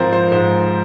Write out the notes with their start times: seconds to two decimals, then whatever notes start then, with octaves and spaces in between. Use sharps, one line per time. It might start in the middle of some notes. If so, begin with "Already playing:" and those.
Already playing: G#2 F3 C4 A#4 C5
0.13 C5
0.32 G#2 C5